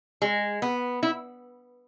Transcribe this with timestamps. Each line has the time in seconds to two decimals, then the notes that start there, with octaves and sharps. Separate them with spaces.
0.22 G#3
0.62 B3
1.03 E4